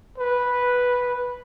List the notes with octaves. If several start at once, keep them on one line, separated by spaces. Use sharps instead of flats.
B4